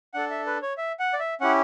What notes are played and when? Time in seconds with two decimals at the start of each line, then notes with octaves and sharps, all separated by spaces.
0.14 D4 A4 F#5
0.30 E5
0.46 B4
0.62 C#5
0.77 E5
0.99 F#5
1.13 D5
1.19 E5
1.41 C#4 E4 G4 F#5